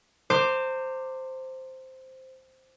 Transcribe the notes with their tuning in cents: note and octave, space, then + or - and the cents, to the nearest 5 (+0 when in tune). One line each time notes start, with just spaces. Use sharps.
C5 +0 A#5 -40 D6 +5